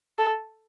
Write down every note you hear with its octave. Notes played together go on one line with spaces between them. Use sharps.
A4